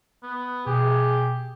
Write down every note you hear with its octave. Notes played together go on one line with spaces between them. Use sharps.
B3
B2 G4 G#4